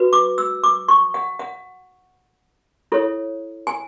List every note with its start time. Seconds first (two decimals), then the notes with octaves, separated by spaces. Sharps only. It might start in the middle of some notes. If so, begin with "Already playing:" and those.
Already playing: F#4 B4
0.13 D6
0.38 E6
0.64 D6
0.88 C#6
1.14 F#5
1.39 F#5
2.92 E4 A4 C#5
3.67 G#5